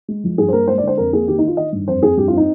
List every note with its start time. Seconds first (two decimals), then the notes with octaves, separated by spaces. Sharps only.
0.08 G#3
0.24 F3
0.38 G2 G#4
0.48 C5
0.53 A#3 A#4
0.68 G#3 C5
0.78 D5
0.83 D3 C5
0.97 F2 A#4
1.13 A#3 G#4
1.28 D#3 G4
1.38 D#4
1.42 D#3
1.48 F4
1.57 D#3 D#5
1.72 G2
1.88 F2 C5
2.03 F2 G#4
2.17 G2 G4
2.28 F4
2.32 C4 D#4